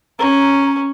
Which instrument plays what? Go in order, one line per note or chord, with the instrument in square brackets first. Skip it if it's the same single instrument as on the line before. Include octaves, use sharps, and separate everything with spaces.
[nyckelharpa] C#4 [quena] A#5